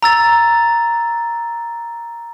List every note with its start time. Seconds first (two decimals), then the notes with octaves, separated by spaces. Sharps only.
0.03 A#5 E6 A6